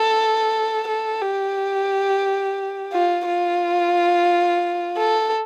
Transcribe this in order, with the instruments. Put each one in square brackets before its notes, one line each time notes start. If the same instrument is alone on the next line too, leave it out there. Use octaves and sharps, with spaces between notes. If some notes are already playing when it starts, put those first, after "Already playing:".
Already playing: [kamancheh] A4
A4
G4
F4
F4
A4